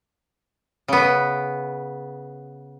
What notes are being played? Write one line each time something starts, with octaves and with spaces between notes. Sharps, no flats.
C#3 B3